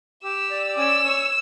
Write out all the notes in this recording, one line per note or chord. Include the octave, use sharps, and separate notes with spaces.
G4 E6
D5
C#4 E6
C#5